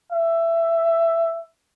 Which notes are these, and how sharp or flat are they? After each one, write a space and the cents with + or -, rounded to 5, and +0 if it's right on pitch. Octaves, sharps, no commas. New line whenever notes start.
E5 +15